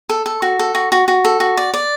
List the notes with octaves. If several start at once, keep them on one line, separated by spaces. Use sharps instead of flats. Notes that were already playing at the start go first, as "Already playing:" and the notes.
A4
A4
F#4
A4
F#4
F#4
F#4
A4
F#4
D5
D5